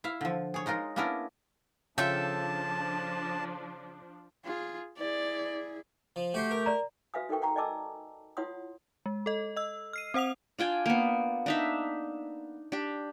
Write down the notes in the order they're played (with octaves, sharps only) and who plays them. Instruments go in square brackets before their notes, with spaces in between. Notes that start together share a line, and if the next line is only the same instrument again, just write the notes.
[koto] E4 E5 F5
D3 F3
G#4 C#5
G#3 D#4 F4 A#4
A#3 B3 C#4 D4 E4 A#4
[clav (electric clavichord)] C#3 F4 [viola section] F3 D4 [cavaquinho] A4 E5 G5 [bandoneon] A5
[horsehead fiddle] F4 G#4
[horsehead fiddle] E4 G#4 [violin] D5
[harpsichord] F3
[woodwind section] A3 G4 [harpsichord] F#4 F#5 C6
[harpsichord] A#4
[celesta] D5 A#5
[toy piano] F#4 B4 E5 F5 G#5 D#6
D#4 A4 A#4 G5 C#6
F#5 G5 A#5 C#6
D5 D#5 G#5 A5 D6 E6
E4 F4 C#5 F#5 C6 D#6
[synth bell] G#3
A4 D#5
D#5 E6
F6 C7 D#7
C4 C5 F#5 D#6 F7
[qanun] D4 F4 G5 G#5
A#3 B3
D4 D#4 E5
D4 G4